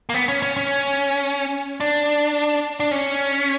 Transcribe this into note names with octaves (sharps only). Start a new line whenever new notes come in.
A#3
B3
C#4
C#4
C#4
D4
D4
C#4